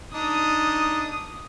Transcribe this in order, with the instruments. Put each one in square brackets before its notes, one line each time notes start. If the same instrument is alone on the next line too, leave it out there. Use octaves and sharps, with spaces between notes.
[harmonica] D4 D#4 [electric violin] D#6